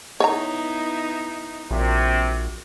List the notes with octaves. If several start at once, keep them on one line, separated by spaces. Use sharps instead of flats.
B3 D#4 E4 C#5 D#5 A#5
A#1 C3 F#4